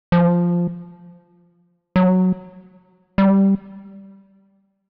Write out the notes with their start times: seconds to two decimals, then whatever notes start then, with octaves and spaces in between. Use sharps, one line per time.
0.12 F3
1.96 F#3
3.18 G3